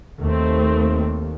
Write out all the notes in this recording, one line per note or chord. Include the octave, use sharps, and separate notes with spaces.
D#2 A3 C4